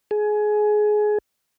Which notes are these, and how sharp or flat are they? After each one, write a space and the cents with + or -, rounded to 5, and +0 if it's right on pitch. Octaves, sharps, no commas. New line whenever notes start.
G#4 +20